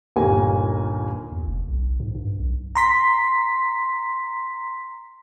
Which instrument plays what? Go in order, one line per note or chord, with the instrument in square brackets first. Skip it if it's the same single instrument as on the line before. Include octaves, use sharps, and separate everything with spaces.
[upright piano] G1 D#2 A#2 D#4 A#4 G#5
[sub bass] D#2
F1
B1
G#2
G2
B1
[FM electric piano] A#5 C6 B6